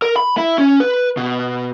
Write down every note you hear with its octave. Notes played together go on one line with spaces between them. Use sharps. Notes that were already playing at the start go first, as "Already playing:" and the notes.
A#4
B5
E4
C#4
B4
B2